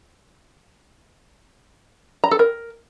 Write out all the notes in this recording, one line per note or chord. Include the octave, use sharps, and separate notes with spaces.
A#5
A4
A#4